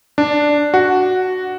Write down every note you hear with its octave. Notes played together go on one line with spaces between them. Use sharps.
D4
F#4